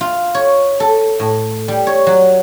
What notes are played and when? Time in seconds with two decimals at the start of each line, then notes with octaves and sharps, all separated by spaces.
0.01 F4
0.35 C#5
0.80 A4
1.20 A2
1.68 G3
1.87 C#5
2.07 F#3